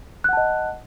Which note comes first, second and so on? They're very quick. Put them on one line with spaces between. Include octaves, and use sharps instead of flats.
F#6 F#5 A5 D#5